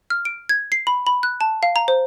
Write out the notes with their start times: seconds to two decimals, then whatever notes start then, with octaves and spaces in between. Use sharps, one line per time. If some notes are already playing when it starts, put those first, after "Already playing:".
0.10 F6
0.25 D7
0.49 G#6
0.72 C7
0.87 B5
1.07 B5
1.23 F#6
1.41 A5
1.63 F5
1.76 A#5
1.88 C5